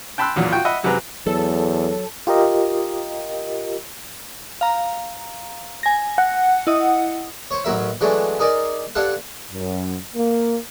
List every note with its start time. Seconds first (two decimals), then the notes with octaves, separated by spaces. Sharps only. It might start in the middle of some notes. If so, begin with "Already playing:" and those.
0.18 G5 A5 B5 C6 E6 F#6
0.36 B1 E2 A#2 F#3
0.52 F4 F#4 G5 C#6
0.65 D#5 E5 F#5 B5
0.83 F#2 C3 F#3 G#4 B4 A#5
1.26 E2 F#3 A4
2.27 F4 G4 A#4 D#5
4.61 F5 A#5
5.83 G#5 A#6
6.18 F#5
6.67 E4 D#5 D#6
7.51 C5 C#5
7.65 A1 F#3 A#4 E5
8.01 E3 F#3 G#3 A3 D4
8.39 D#4 G#4 A#4 D5
8.95 G2 D4 A4 F5 F#5
9.53 F#2
10.15 A#3